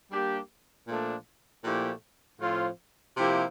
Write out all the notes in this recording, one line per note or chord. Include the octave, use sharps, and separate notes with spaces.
G3 A#3 D4 G4
A#2 F3 A3 D4
A#2 F3 A3 E4 G4
A2 F3 C4 F4
C3 F3 A#3 E4 G4